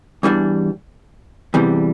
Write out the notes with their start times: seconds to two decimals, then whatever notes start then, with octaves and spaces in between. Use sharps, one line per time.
0.23 E2 E3 G3 D4
1.54 E2 C3 E3 G3